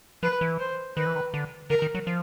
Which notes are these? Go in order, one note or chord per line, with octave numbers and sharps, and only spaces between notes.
F3 B4
E3
C5
D#3 B4
E3
D#3
D3
D3 A#4
D#3
F#3
F3